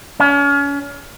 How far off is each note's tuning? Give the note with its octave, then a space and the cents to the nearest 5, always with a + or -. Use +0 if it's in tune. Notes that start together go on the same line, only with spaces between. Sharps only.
C#4 +35